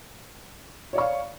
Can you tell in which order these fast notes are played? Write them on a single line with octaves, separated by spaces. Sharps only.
C#5 D5 C#6 F5